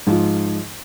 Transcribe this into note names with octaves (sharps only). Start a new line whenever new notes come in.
G#2 F3